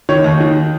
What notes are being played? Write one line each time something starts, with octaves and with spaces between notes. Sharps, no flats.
D#3 C#5
D#2
D#3